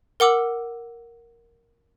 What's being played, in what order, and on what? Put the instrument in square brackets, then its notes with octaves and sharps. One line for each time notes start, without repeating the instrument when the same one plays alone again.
[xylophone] A#4 F#5 D6 E6 F#7